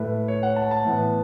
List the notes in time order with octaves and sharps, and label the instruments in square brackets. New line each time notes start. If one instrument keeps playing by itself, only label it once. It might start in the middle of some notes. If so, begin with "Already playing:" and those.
Already playing: [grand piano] A2 A3 B4
C#5
F#5
A5
A5
A2 E3 B3